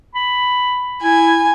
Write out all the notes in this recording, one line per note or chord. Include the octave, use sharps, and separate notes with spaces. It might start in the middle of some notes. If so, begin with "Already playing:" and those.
B5
E4 G#5